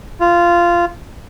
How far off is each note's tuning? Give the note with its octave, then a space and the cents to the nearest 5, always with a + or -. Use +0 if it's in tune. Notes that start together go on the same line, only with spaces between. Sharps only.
F4 -15